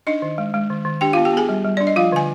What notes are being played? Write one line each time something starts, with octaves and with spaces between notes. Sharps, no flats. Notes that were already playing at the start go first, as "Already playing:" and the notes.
D4 D#4 D#5
D#3
G#3
G#3
D#3
D#3
D4 G4 G5
F4 F5
B3
G4 G5
B3 G#4 G#5
G3
G3
D4 D5
D#5
F3 F4 F5
D3 G#5